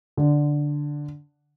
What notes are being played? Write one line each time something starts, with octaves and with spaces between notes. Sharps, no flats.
D3